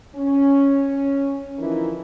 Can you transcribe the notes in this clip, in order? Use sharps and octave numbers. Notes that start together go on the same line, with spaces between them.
C#4
D3 E3 F3 D#4 E4 A#4